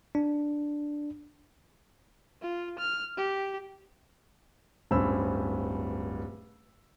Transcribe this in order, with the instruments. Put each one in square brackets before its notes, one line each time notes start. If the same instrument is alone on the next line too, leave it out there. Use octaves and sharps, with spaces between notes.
[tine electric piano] D4
[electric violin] F4
F6
G4
[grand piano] D1 G2 C#4 C5 B5 E6